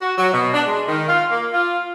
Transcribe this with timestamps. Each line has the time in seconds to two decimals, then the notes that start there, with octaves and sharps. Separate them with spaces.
0.02 F#4
0.18 F#3
0.33 B2
0.54 D4
0.66 G#3
0.88 D#3
1.08 F4
1.31 A#3
1.53 F4